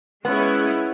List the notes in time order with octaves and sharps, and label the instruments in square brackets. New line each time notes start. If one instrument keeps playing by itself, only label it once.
[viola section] G#3 C#4 E4 [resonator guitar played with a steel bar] B3